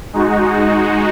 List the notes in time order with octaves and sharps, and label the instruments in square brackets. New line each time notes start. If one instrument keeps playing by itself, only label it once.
[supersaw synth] G#3 D#4 F#4